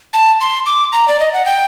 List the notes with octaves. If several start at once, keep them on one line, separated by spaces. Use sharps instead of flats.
A5
C6
D6
A#5
D5
D#5
F#5
G5